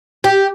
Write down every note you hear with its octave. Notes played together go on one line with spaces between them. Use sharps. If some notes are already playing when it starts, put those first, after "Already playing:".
G4